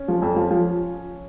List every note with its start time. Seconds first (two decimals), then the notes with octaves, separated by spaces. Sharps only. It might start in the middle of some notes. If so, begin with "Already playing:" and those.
Already playing: C#4
0.08 F3
0.22 F2
0.36 F3
0.51 F3